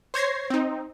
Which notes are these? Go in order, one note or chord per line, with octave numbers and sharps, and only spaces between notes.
C5 C#5 G#6 A#6 C7
C4 D#4